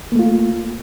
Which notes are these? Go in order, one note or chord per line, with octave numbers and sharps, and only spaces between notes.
A3 A#3 F4